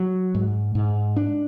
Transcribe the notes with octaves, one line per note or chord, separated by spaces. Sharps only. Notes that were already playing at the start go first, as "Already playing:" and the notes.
Already playing: F#3
G#2
G#2
D4